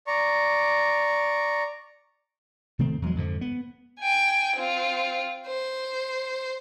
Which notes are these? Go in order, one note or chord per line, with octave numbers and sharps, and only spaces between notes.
D5 A#5 C#6
C3 D#3 A3 C4
E2 F#3 G#3
F2 G#2 D3 F3
B3
G5 G#5
C4 F4
C5